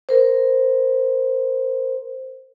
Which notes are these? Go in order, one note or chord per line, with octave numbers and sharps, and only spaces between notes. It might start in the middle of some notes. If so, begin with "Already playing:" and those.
A#4 C5